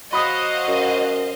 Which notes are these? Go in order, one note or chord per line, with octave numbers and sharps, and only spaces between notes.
F#3 F#4 C5 D#5 F5 B5 D#6
F#2